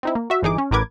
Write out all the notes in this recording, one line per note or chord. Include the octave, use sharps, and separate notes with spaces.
C4 D#4 E4
A#3
F#4 E5
G1 E3 D#4 G#4 D6
C#4
A1 A2 A#4 B4 D6 G#6